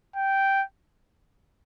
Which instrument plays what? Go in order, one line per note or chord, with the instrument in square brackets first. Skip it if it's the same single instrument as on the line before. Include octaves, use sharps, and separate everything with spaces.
[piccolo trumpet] G5